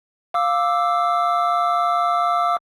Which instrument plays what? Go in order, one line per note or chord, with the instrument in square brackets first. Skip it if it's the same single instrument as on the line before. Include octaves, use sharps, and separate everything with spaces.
[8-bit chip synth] F5 D6 E6